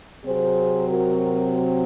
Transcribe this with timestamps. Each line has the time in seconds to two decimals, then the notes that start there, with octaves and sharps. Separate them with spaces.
0.24 C3 F#3 C4 G#4 C5
0.89 F#4 A#4